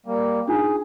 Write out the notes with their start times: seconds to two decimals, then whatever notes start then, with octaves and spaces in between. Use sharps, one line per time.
0.06 G3 A#3
0.48 D4 D#4 F4 G#4